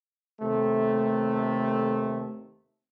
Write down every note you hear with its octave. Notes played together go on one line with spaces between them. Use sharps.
D#2 C3 A3